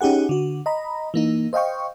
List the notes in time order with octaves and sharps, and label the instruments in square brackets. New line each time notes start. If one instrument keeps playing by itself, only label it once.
[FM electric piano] C#4 D#4 G4 G#4 F#5
D3 F#4
D#5 A#5 B5
E3 A#3 D#4
C5 D#5 F5 G5 C#6